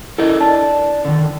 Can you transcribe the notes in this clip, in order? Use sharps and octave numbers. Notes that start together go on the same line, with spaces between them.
E4 A4 A#4 D#5
D4 A5
D3 D#3